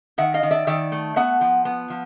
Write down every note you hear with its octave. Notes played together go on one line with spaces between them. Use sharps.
D#3 E5 F#5
D#5 F5
D#3
D5 E5
D#3 D5 E5
A3
B3 E5 F#5
F3
B3
F3